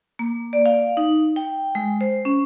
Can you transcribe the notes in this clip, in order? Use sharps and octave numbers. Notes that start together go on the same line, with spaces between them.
A#3
D5
F5
D#4
G5
G#3
C5
C#4